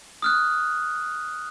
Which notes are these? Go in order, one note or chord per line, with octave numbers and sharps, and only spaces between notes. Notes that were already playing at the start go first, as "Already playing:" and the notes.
D#6 F6 F#6